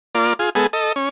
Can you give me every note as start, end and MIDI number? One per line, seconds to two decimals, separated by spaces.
0.15 0.33 58
0.15 0.33 65
0.15 0.33 74
0.39 0.50 65
0.39 0.50 68
0.55 0.67 56
0.55 0.67 59
0.55 0.67 68
0.55 0.67 69
0.73 0.92 69
0.73 0.92 75
0.96 1.09 61